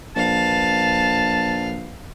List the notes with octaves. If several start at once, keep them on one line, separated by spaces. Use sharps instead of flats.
A#1 B4 F5 A5